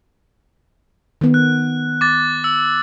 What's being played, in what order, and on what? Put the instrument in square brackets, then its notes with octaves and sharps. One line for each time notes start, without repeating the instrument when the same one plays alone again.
[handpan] D#3 B3
[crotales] F#6
D6 A6
E6